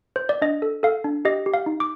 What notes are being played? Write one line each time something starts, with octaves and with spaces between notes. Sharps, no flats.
C5
D5
D4 D#5
A4
A4 F5
D4
G4 D#5
G4
F5
D#4
D6